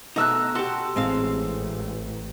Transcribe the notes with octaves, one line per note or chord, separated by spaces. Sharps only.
B2 A3 D#4 A#5 E6 F#6
F#4 G4 A4 A5 C6
A1 G#3 C4 F5